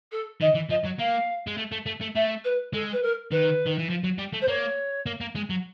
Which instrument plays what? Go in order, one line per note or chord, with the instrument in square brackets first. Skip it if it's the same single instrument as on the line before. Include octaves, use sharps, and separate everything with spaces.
[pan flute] A4
[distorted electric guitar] D#3 [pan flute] D#5
[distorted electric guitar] E3
[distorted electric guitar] F3 [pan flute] D#5
[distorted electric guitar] F#3
[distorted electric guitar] A#3 [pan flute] F5
[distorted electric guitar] G#3
A3
A3
A3
A3
[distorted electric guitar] A3 [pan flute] E5
[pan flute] B4
[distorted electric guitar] G#3 [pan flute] A4
[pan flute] B4
A#4
[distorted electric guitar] D#3 [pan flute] B4
[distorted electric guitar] D#3
E3
F3
F#3
G3
A3
[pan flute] C5
[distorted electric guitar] A#3 [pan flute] C#5
[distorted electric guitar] A#3
A#3
G#3
F#3